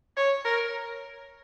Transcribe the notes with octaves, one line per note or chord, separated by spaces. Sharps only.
C#5
A#4